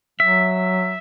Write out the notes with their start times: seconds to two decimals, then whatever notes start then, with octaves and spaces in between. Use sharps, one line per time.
0.20 F#3 E5